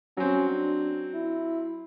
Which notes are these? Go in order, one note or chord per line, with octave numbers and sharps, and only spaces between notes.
F#3 C4 C#4
D4
E4